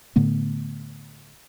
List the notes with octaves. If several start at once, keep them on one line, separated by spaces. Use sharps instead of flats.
A2 D3 A3 B3